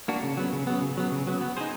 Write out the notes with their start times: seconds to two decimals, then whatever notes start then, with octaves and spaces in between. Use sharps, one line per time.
0.08 A#3 D4 F#4
0.23 C#3
0.37 F#3 B3
0.53 C#3
0.67 F#3 B3
0.82 C#3
0.97 F#3 B3
1.12 C#3
1.27 F#3 B3
1.41 B3
1.57 D#4 G#4 C5